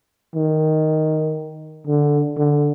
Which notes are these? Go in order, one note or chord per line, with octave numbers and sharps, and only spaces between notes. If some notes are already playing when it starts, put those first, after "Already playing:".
D#3
D3
D3